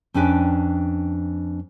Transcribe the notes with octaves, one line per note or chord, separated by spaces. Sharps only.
F2 C#4 D4 B4 G5 G#5